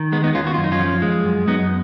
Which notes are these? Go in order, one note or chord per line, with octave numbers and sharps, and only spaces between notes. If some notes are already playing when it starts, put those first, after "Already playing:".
Already playing: D#3
G#3 B3
B3 D#4
D#2 C#4 F4
F#4
F#2 F4
D#4
C#4 F4
F3
G#3
F#2
F#2 B3 D#4